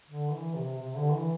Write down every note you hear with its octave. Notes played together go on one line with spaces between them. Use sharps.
D3
E3
C3
C3
D3
E3